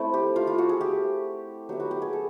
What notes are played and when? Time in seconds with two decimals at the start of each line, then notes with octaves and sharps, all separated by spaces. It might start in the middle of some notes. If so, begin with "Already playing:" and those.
Already playing: A3 C4 E4
0.14 G4
0.36 F4
0.47 F4
0.58 F#4
0.69 G#4
0.81 G4
1.69 F#3 B3 E4 G4
1.80 F#4
1.91 G4
2.02 G#4
2.13 A4